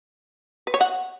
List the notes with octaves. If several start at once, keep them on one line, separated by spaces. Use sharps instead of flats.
B4
C#5
F#5